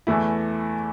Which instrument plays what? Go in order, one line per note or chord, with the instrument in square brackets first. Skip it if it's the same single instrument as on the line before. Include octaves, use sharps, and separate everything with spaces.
[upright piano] E2 E3 A3 E4